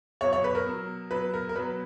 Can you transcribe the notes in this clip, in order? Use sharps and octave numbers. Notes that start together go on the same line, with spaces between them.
B2 F#3 C#5
C#5
B4
A#4
B2 F#3
B2 F#3 B4
A#4
A#4
B2 F#3 B4